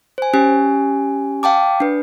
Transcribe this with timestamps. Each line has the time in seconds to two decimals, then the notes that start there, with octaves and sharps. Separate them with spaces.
0.18 C5 G#5
0.33 C#4 G4 G#5
1.43 F5 G5 A5 D6
1.80 D4 B4